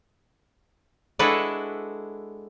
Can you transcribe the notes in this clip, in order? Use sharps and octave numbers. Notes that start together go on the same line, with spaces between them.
G#3 D4 E4 F#4 A4 B4